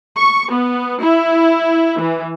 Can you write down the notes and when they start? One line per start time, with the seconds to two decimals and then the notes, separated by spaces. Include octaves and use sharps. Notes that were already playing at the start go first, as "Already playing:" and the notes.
0.18 C#6
0.52 B3
1.02 E4
2.00 E3